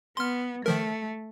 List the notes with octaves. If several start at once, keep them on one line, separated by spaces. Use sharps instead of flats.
B3 C6 F6
D#3 F3 A3 A#4